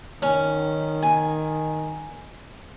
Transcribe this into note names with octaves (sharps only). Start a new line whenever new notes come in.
D#3 C#4
G#5